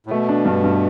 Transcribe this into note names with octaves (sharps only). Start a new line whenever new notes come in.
A2
B2 A3
D4
G2
G2